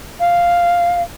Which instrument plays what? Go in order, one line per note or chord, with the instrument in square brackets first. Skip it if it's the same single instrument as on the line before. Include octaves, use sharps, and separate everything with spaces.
[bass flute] F5